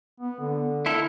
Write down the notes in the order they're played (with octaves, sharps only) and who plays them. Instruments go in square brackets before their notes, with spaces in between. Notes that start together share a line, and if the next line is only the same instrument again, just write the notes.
[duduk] B3
D3
[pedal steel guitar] E4 A4 A#4